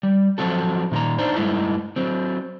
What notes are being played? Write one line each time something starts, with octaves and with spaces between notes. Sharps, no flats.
G3
F3 F#3 C4 F#4 A4
A#2 D#3 A#4 A#5
D4 D#4 C5
G2 B2 G#3 A3 D#4 E4
F#3 C4